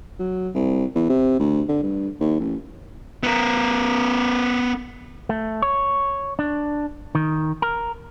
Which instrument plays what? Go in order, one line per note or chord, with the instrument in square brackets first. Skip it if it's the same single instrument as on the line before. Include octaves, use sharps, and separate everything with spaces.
[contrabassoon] F#3
C2
E2
C3
D2
D3
G2
D#2
A1
[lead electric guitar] B3 A#4
[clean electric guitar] A3
C#5
D4
D#3
A#4